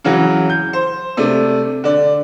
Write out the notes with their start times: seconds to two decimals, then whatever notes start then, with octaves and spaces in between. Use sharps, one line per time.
0.05 C#3 E3 F#3
0.50 G6
0.73 C5
1.17 C3 A3 D4
1.84 D3 D5